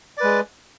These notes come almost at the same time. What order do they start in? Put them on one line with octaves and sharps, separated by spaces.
D5 B4 G#3